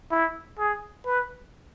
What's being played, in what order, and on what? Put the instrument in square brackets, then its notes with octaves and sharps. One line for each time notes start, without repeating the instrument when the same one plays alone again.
[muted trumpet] E4
G#4
B4